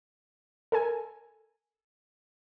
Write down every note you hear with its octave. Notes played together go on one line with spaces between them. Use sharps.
A4 A#4 G#5